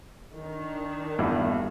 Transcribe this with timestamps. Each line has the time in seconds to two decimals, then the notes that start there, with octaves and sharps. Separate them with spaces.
0.38 D#3 D4
1.19 E2 G2 B2